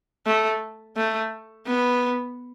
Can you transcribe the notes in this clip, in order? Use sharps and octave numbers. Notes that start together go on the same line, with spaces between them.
A3
A3
B3